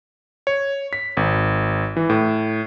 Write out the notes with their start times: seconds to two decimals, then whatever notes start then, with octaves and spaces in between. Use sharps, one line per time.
0.47 C#5
0.93 B6
1.17 G#1
1.97 E3
2.10 A2